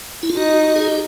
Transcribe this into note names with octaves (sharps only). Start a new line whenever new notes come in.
E4
F4
D#4 F#4
G#4
G4